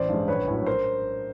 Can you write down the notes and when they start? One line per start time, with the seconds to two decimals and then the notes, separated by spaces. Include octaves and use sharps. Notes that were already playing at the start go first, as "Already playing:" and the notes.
Already playing: A1 C5 D5
0.09 G2 E3 G#3
0.28 A#1 B4 C#5
0.48 A2 F#3
0.66 A#4 C5